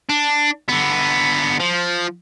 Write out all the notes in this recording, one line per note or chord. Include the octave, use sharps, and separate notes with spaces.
D4
D3 B3
F3